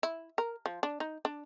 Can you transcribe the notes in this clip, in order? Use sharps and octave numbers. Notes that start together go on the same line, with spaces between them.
E4
A#4
F3
D4
D#4
D4